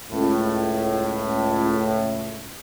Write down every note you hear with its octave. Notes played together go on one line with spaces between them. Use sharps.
C#2 A2